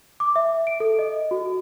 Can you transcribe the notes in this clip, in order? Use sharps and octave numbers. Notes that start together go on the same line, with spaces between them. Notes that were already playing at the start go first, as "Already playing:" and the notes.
D6
E5
D7
A4
D#5
F#4